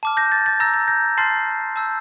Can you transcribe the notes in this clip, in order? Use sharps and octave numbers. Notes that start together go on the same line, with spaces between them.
A5 D6 F6
G6 A#6
A6
A6
A#5 E6 G6 A#6
A6
G6 A#6
A5 C6 F6 A6 C7
A5 E6 G6